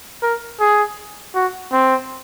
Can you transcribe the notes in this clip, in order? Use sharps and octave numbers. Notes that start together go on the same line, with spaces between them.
A#4
G#4
F#4
C4